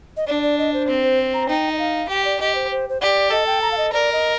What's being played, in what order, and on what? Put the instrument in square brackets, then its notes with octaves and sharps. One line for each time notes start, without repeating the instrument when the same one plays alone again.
[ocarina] D#5
[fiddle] D4 [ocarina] D5
[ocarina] D5
D#5
C5
[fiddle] C4
[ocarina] C5
A#5
[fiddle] D#4 [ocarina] G5
[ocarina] D#5
F5
[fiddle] G4 [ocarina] G5
[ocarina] D5
[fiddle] G4 [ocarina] D#5
[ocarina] C5
C5
C5
[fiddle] G4 [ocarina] D5
[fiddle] A4 [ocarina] D#5
[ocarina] G5
A#5
F5
D#5
[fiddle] A#4 [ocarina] D5
[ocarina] D#5